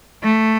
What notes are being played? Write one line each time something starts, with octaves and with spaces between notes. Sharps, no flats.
A3